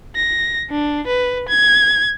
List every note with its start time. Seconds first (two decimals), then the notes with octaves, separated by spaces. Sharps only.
0.16 A#6
0.70 D4
1.07 B4
1.49 G#6